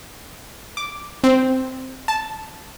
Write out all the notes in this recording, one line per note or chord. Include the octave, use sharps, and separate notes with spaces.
D6
C4
A5